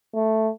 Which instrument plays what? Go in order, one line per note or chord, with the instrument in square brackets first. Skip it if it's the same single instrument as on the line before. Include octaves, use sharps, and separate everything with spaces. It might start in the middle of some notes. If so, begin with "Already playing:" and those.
[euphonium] A3